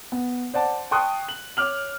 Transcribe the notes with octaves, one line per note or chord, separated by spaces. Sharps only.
B3
C5 D5 F#5 A5
G5 A5 C6 C#6 D#6 F#6
F#7
C#5 D6 F6 F#7